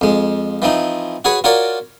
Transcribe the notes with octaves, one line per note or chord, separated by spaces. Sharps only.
F2 G#3
E3 F3 C4 D#4
F#4 G#4 B4 C#5
F4 F#4 A#4 C#5 D5